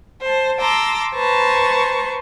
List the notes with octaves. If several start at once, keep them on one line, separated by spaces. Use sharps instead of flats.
C5 A5
A5 A#5 C6 D6 E6
B4 C5 A5 A#5 C#6